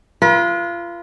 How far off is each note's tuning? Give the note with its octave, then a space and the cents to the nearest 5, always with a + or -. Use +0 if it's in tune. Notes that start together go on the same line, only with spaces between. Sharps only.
F4 -25 B4 -45